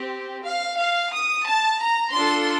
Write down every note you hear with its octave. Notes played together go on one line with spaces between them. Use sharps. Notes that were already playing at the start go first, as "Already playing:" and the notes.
Already playing: C4 G4
F5
F5
D#6
A5
A#5
D4 F4 A4 C6